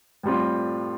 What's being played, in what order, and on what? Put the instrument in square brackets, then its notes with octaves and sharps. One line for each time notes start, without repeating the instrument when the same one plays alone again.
[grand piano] A2 G3 C4 F4